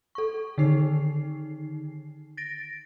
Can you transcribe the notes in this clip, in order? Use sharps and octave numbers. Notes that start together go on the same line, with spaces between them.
A4 C#6
D3 D#3 D#4 C7
A6 A#6 D7